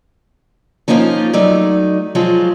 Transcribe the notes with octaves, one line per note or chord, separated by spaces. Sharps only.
F3 A#3 C#4 D#4 F4
F#3 A3 D#4 D5
F3 F#3 G#3 F4